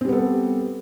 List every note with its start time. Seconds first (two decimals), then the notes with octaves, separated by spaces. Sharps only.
0.01 C4
0.05 G3
0.09 B3
0.12 A4